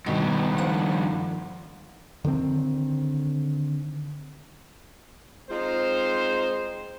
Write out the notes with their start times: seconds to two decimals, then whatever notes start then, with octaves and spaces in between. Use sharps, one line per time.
0.06 G2 B2 D#3
0.58 F3 F#5
2.25 D3 D#3 B3 C4
5.50 G#3 C4 D#4 F4 C5